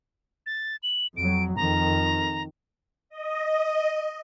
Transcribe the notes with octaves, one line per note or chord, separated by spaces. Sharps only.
A6
F#7
F2 F#3 D7
F2 D#3 A#5
D#5